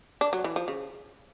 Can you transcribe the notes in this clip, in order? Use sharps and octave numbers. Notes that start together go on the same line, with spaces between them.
D4
F#3
E3
F3
C#3